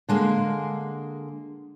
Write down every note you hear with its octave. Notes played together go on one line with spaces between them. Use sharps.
D3 G#3 A#3